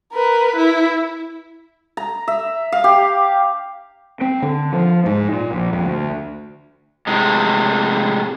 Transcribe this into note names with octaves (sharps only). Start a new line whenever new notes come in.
A#4 B4
E4
A#5
E5
F5
G4
C4
D3
F3
G#2
A#2
A#1
F2
D2
A2 C3 G#3